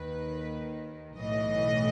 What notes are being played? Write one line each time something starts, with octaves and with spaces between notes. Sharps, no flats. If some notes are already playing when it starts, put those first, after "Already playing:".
Already playing: D#2 D#3 B4
B1 A2 E3 D#5